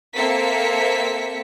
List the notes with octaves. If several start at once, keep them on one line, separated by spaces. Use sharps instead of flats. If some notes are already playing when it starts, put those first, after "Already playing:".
A#3 C4 A4 E5 B6 C#7